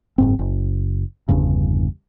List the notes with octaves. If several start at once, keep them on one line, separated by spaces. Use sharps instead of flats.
F#1 G#2 C4
F#1
G1 E2 G2 C#3